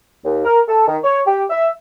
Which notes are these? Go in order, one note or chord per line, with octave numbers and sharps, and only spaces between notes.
D#2
A#4
A4
D#3
C#5
G4
E5